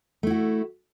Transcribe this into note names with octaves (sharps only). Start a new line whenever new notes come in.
A3 E4 F#4